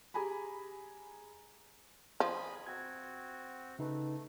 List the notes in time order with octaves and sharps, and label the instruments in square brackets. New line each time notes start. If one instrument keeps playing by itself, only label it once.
[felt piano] G4 G#4 G#5 A#5 B5
[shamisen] F3 [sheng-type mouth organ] D#5 G#5 B5
[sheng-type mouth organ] C4 F#4 [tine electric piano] G#6
[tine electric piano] C#3 D#4 B4 [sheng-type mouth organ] A3